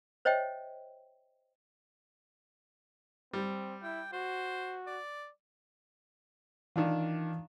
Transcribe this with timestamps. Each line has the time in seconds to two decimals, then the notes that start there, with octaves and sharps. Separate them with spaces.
0.25 C5 C#5 D#5 E5 G5
3.33 G3 C4
3.82 E4 G5
4.13 F#4 C5
4.87 D5
6.76 D#3 E3 D4 F4